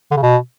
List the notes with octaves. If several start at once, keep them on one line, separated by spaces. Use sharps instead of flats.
D3
C#3
B2